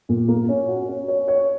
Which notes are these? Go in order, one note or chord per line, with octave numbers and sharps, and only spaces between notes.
A#2
A#3
C#4
F#4
C#4
C#5
C#5